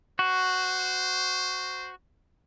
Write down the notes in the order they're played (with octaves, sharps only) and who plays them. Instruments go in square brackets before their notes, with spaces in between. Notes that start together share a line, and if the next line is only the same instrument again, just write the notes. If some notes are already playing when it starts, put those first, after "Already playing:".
[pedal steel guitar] F#4 [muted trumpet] C5